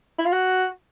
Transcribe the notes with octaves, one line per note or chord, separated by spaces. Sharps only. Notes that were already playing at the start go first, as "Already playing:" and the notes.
E4
F4
F#4